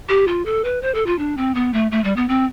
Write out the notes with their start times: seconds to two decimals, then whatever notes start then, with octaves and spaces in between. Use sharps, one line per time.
0.09 G4
0.28 F4
0.45 A4
0.64 B4
0.82 C5
0.94 A4
1.06 F4
1.19 D4
1.37 C4
1.55 B3
1.73 A3
1.91 A3
2.04 G3
2.16 B3
2.29 C4